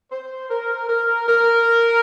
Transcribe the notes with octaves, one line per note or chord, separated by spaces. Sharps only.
C5
A#4
A#4
A#4